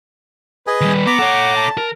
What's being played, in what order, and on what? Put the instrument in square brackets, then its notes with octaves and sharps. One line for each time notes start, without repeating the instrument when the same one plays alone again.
[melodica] G#4 D#5 G#5 [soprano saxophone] B4
[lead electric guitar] D#3 G3
[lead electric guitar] B3 [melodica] A#5 D6
[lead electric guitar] A4 C#5 [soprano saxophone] F#5
[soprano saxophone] A5
[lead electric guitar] A#4